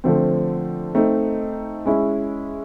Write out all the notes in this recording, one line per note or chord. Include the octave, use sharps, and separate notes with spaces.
D3 F3 A3 C4
A3 C4 D#4
G#3 C#4 E4